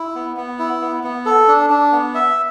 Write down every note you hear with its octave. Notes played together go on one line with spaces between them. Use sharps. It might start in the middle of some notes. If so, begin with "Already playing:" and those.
Already playing: E4
B3
B3
E4
B3
B3
A4
D4
D4
B3
E5